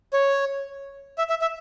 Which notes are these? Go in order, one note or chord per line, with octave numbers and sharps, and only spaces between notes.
C#5
E5
E5
E5